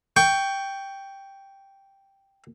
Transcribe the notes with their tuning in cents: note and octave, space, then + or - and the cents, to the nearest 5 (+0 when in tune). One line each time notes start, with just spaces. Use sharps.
G5 +0 C#6 +20